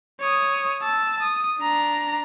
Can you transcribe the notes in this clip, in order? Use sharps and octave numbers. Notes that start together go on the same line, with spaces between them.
C#5 D#6
A5 E6
D#6
D4 A#5